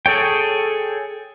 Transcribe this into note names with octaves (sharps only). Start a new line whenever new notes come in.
G#4 A4 C#5 G5